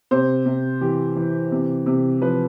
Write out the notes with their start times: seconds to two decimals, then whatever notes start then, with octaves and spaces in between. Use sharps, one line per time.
0.11 C3 C5
0.46 C3
0.81 E3 G4
1.16 E3
1.52 C3
1.86 C3
2.21 F3 B4